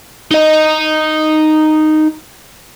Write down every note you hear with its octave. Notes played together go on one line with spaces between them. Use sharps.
D#4 D#5